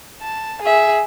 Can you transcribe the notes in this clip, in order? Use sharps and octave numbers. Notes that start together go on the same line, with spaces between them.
A5
G#4 E5